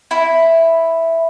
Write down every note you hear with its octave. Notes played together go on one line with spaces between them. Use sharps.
E4